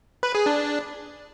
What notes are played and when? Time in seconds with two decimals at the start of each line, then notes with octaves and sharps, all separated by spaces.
0.23 B4
0.35 G#4
0.46 D4